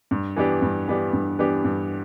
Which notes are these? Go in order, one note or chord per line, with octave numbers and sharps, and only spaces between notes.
G2
E3 B3 D4 G4
G2
E3 B3 D4 G4
G2
E3 B3 D4 G4
G2